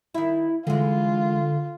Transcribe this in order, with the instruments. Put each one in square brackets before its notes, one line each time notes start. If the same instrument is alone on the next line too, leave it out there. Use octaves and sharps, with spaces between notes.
[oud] D#3 E5 [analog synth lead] E4
[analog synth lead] D3 [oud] E3 G#3 [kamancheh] F4